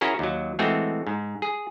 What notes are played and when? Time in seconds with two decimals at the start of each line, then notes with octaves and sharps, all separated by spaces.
0.01 C#4 E4 F#4 G#4 A#4
0.19 D#2 F#3
0.59 E3 G#3 A3 C4 F#4
1.07 G#2
1.42 G#4